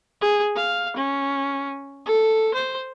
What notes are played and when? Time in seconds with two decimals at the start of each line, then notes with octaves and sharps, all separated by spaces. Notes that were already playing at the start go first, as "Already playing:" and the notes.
0.21 G#4
0.56 F5
0.96 C#4
2.06 A4
2.54 C5